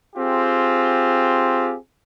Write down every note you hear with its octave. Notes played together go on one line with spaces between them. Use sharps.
C4 F4 G4 G#4